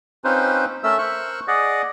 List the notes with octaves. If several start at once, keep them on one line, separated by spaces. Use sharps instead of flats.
C4 C#4 D#4 F4 B4 C5
A3 C#4 A4 A#4 E5 E6
A#4 C5 C#6 E6 F#6
G#4 D5 D#5 F#5